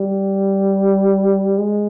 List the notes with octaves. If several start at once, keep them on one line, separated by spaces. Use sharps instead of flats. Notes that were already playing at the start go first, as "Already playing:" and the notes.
Already playing: G3
G#3